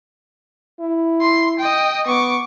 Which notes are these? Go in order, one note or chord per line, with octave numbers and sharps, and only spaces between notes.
E4
C6
D#5 G5
B3 C#6 D6